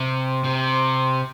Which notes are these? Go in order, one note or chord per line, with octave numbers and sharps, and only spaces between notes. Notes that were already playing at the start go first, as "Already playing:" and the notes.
Already playing: C3
C3